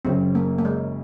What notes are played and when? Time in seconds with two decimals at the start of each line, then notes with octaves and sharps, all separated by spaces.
0.05 F#1 F#2 C#3 C4
0.35 A#3
0.58 A#3
0.65 G#3